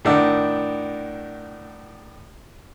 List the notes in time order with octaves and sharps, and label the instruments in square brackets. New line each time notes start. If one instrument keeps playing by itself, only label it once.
[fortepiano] A2 D#3 D4 F#5 E6